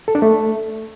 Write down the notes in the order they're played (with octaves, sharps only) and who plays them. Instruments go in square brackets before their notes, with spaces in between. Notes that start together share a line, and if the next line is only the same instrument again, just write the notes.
[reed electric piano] A4
D4
A3